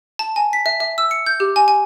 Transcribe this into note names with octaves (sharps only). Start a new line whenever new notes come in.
A5
G#5
B6
E5
E5
E6
C#7
G6
G4
G#5
G#5